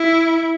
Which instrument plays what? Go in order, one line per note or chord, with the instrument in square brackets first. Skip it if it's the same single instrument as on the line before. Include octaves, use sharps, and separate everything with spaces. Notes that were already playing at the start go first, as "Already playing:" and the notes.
Already playing: [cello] E4